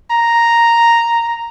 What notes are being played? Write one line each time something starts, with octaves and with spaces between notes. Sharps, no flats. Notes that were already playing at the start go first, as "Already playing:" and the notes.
A#5